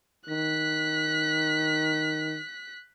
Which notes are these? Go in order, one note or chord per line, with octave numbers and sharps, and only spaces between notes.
D#3 F#6 B6